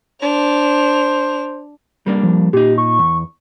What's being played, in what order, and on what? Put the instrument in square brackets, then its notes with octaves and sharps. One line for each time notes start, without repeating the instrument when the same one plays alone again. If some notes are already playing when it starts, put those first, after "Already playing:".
[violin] D4 F7 [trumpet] C5
[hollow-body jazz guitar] G3 A#3 D4
[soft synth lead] F3
[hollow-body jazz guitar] A#2 D#4 [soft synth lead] G4
[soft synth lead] C#6
[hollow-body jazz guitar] E2